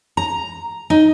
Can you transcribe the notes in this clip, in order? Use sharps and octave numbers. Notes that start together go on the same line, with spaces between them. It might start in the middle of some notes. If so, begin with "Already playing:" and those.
A#5
D#4